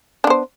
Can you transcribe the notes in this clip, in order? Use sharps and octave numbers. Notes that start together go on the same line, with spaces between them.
B3 D4 C5